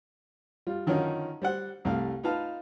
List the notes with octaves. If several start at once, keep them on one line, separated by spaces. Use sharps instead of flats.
G3 F4
D3 D#3 F3 F#3 C#4 D#4
G3 C5 F#5
C2 G3 A3 F5
D#4 F4 B4 F5 A5